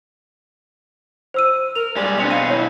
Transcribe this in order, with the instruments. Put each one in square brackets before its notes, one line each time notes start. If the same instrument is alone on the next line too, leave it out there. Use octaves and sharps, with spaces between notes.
[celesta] C5 E6 D#7
[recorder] A#4 [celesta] F7
[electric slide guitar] G2 G3 G#3 [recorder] D5
[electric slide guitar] B2 C4 B4 [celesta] D4 C#7 F7
[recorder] F5 [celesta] D#7
[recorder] E4 [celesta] C#5